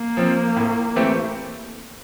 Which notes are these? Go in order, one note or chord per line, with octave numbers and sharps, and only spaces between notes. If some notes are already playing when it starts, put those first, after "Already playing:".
Already playing: A#3
F3 C4
A2
E3 A3 C4 G4